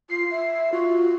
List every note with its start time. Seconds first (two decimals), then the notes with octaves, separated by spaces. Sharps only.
0.10 F4 C7
0.31 E5
0.73 F4 F#4